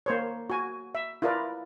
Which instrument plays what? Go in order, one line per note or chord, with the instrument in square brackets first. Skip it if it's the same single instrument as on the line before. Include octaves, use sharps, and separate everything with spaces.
[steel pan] A#3 C5 C#5
F#4 G#5
E5
E4 F4 A#4 B4 D5